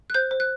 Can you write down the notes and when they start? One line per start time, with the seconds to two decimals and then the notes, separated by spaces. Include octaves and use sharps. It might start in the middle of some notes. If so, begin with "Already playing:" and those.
0.10 F#6
0.14 C5 G6
0.31 C5
0.40 F#6